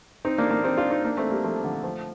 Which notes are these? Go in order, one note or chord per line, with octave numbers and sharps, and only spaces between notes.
C4 D#4
A#3 D4
A#3 D4
C4 D#4
D4 F4
C4 D#4
A#3 D4
A3 C4
G3 A#3
F3 A3
D3 F3
F3 A3